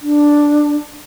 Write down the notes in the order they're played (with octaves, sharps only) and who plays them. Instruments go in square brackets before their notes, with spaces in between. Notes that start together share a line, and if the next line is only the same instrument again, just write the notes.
[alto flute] D4